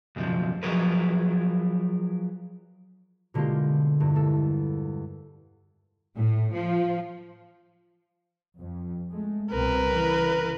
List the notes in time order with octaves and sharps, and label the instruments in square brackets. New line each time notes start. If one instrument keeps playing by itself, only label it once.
[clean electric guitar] B1 F#2 C#3 F3
F3 F#3 G#4 A#4 B4
[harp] B2 D3 G#3 A#3 F4 G4
E2 G2
A#3 A4
[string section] A2
F3
[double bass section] F2
G#3 A3
[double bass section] C2 B2 C4 [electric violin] A#4 B4
[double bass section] C#3 E3